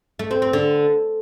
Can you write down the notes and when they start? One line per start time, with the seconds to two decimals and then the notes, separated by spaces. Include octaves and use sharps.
0.19 A3
0.31 C4
0.42 C4
0.53 D3